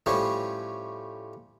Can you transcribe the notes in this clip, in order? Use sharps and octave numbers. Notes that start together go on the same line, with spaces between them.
A2 F3 G3 C#4